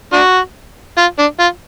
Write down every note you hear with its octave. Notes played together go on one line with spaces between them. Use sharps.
D4 F#4
F4
D4
F4